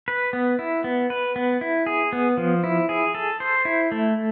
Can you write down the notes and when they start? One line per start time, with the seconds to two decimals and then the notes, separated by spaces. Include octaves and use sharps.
0.08 B4
0.33 B3
0.59 E4
0.84 B3
1.10 B4
1.36 B3
1.61 E4
1.86 G#4
2.13 B3
2.37 F3
2.64 E4
2.89 G#4
3.14 A4
3.40 C5
3.65 E4
3.92 A3